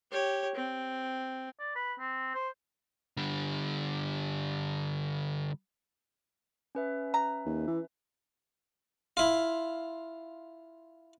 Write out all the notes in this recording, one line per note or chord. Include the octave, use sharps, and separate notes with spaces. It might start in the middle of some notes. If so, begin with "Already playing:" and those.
G4 C#5
C4
D5
B4
C4
C5
D3 G3
C#4 B4 E5
A#5
D#2
E3
E4 F4